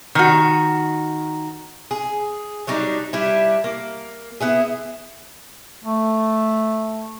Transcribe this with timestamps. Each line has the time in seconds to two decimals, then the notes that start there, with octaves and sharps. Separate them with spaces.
0.15 D#3 F#4
1.91 G#4
2.67 F#3 G3 D4 D#4
3.13 G3 D4 E4
3.64 A#3
4.41 B3 E4 G#4
5.84 A3